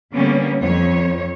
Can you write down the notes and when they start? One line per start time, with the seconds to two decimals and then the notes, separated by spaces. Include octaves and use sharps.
0.13 D3 G3 A#3 B3 C#4
0.60 F2 C#5